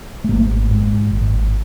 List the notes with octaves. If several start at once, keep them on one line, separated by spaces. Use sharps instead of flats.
A3
G#1 A#3
G#2
G#1